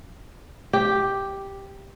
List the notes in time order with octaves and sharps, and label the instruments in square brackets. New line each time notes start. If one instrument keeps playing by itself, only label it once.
[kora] G4